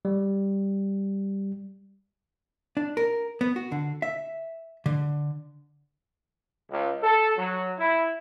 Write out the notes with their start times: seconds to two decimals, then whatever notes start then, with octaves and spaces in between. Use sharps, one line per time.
0.05 G3
2.77 D4
2.97 A#4
3.41 B3
3.56 F#4
3.72 D3
4.02 E5
4.86 D3
6.69 C#2
7.02 A4
7.37 F#3
7.78 E4